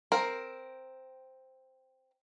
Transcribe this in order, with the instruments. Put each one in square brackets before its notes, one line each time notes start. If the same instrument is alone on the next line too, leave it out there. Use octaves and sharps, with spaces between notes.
[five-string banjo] C4 A#4